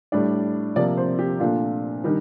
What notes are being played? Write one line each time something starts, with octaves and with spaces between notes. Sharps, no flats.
A2 G3 D4 D5
C3 F3 A#3 D5
C5
G4
A#2 A3 D4 F4
D#3 G3 D4